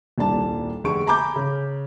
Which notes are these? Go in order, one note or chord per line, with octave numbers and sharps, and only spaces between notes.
D#1 C2 A#2 D4 A5
F1 D3 G#4 C#6 D7
G#5 A#5 B5 D6 G6
C#3